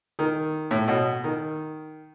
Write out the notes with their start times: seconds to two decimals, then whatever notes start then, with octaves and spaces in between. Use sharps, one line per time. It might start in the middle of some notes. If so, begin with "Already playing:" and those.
0.19 D#3
0.71 A2
0.88 B2
1.24 D#3